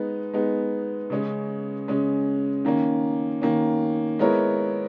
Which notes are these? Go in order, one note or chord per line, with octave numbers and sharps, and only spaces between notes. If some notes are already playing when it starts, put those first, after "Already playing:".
Already playing: G#3 B3 D#4
G#3 B3 D#4
C#3 G#3 C#4
C#3 G#3 C#4
D#3 A#3 C#4
D#3 A#3 C#4
G#3 B3 E4 A#4 C#5